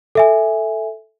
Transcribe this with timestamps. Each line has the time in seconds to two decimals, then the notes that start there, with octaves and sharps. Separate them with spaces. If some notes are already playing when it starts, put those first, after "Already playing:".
0.15 A4 E5 G#5